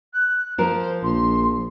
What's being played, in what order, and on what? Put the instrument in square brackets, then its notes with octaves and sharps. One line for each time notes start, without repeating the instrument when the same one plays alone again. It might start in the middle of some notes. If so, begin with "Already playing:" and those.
[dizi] F#6
[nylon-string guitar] F3 A#4 [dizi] C5
[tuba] A#1 [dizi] C6